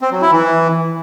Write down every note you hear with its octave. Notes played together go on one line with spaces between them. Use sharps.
C4
F#3
E4
E3